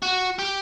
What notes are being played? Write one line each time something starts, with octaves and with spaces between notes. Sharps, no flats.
F#4
G4